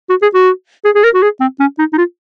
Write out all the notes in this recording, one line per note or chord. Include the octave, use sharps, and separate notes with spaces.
F#4
G#4
F#4
G#4
G#4
A#4
F#4
G#4
C4
C#4
D#4
D#4
F4